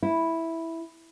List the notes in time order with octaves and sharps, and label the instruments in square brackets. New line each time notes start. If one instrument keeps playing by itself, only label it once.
[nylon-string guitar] E4